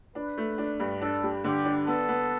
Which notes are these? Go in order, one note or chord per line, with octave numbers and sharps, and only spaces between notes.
D4 B4
A3
D4
G2
D4 A4
G3
D3 G4
D4
B3 A4
B3